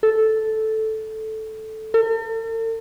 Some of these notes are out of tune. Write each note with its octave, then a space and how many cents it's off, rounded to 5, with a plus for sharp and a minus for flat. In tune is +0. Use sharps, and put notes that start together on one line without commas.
A4 -5
A4 +45